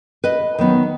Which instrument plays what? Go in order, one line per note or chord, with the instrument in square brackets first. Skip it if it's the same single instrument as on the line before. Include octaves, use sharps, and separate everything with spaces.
[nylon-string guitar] B4 D#5
D#3 F#3 B3 D#4